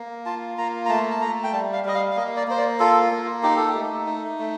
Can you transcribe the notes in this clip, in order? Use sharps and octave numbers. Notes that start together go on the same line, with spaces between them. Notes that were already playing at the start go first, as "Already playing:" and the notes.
Already playing: A#3
F4 A5
A#3 A#5
A#5
A3 A5
A5
A3 A#5
G5
G3 A5
F5
G3 D#5
F5
F5
A#3 D#5
D5
A#3 C5
D5
F4 A4
A#3
D#4 G4
A4
G4
A3
D#4
A3